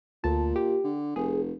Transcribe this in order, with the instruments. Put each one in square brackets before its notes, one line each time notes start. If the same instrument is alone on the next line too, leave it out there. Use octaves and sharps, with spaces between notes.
[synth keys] D2 A5 [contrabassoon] A#2
[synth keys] G4
[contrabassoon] D3
[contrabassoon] F1 [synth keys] G#4